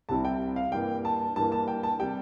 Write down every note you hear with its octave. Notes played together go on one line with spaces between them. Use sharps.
C2 C3 G3 C4 E4 A5
G5
F5
G2 E3 A#3 G5
A5
G2 E3 A#3 A5
A5
G5
A5
C3 G3 G5